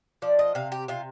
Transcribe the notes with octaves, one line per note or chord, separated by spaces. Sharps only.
F3 D5
D#5
C3 F5
G4
C3 F4